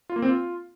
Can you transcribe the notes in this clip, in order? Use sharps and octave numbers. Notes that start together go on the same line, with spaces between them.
F4
A#3
C4
F4